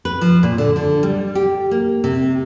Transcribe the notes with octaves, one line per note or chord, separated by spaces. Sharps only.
B4
F3
A#2
D3
D3
G3
G4
A#3
C3